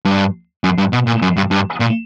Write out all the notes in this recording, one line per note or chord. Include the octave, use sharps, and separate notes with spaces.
G2
F#2
G2
B2
A#2
F#2
G2
G2
A#2